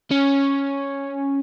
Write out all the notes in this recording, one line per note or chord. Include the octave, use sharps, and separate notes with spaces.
C#4